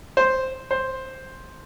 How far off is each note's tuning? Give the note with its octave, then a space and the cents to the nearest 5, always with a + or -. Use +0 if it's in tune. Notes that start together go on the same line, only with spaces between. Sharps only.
C5 +0
C5 +5